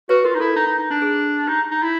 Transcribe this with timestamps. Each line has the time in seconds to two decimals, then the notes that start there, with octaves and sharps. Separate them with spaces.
0.09 F#4 B4 C#5
0.24 F4 A#4
0.35 D#4
0.40 E4 A4
0.56 D#4
0.67 D#4
0.78 D#4
0.90 D4
1.02 G#4
1.47 D#4 G4
1.71 D#4
1.83 E4